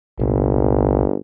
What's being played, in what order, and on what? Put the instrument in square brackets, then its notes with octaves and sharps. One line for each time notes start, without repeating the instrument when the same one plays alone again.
[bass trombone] G1 [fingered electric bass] C2 A#2